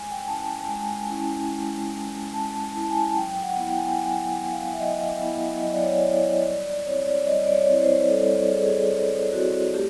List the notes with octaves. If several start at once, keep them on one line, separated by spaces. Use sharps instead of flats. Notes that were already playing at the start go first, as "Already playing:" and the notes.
Already playing: G#3 G#5
G5
G#5
C#4 E4 A5
G#3 G#5
C#4 E4
G#3
C#4 E4
G#3 A5
C#4 E4
A5
G#5
A5
F#3 G5
G5
F#5
B3 E4
G5
G#5
G5
F#3 G#5
G5
B3 E4
F5
E5
F#3 D#5
B3 E4
F#3 D#5
D5
C#5
D5
B3 E4 C#5
D#5
G3 D5
D5
C4 E4 C#5
D5
D5
G3 D#5
D5
C#5
C4 E4
C5
G3 A4
C4 E4 G#4
A4
G#4
G3 G#4
C4 E4 F#4
A3 G4